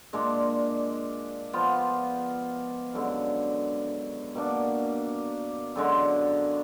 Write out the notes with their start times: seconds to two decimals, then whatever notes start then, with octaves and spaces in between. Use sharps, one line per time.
0.13 A#2 G#3 D4
1.53 F3 B3 F4
2.94 F#2 D3 G#3
4.35 B2 A#3 D4
5.76 F#2 D3 G#3